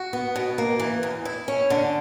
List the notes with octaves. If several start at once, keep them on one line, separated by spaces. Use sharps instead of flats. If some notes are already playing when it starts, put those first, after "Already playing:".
Already playing: F#4
B3
B2
A#3
E3
E2
E4
C#4
D3